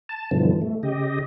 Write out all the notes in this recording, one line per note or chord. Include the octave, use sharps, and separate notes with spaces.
A5
G2 B2 D3 E3 F3
A3
C#3 G4 D#5